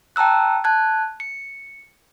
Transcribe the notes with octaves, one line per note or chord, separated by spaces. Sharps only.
G5 A5 A#5 E6 F#6
A5 F#6 G#6
C#7